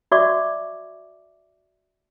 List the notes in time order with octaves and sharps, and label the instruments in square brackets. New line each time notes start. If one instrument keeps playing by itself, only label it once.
[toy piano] F#4 D5 E5 C#6 D6